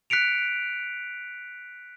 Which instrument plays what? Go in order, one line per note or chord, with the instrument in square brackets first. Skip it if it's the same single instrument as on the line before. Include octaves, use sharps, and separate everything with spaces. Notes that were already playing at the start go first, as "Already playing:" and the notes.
[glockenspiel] F#6 B6 C#7 D7 F7